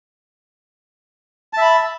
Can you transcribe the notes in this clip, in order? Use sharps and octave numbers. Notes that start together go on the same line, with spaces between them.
E5 A5 B5